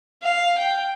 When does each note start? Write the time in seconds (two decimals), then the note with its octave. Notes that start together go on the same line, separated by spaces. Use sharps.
0.23 F5
0.58 G5